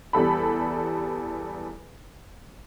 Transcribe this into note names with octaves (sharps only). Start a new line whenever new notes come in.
E2 G3 A4 B5